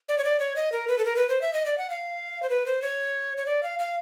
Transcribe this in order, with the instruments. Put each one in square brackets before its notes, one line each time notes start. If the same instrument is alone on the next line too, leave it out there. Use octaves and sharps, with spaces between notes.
[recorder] D5
C#5
D5
C#5
D#5
A#4
B4
A4
A#4
B4
C5
E5
D#5
D5
F#5
F5
C5
B4
C5
C#5
C#5
D5
F5
F5